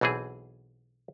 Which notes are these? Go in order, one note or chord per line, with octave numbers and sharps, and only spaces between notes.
B1 B2 E3 C4 G#4